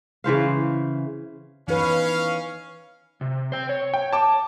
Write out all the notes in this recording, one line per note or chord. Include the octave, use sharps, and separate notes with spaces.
C#3 E3 C5 F5
E3 C#4 D#4 B4 F5
C3
C5 G5
C#5
G5
A5 D6